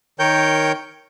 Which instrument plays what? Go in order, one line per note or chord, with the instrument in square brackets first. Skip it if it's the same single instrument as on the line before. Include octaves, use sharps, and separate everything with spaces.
[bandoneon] D#3 A#4 C#5 G5 G6